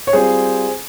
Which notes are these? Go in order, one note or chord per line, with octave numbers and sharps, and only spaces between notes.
C#5
G3 C4 F4 G#4 C5